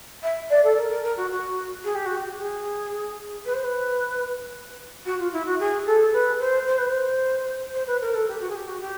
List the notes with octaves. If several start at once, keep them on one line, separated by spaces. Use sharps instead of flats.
E5
D5
A4
A#4
A#4
A#4
F#4
F#4
G#4
G4
F#4
G4
G#4
B4
C5
B4
F#4
F4
E4
F#4
G#4
A4
B4
C5
C5
B4
C5
C5
B4
A#4
A4
G4
F#4
G#4
G4
F#4
G4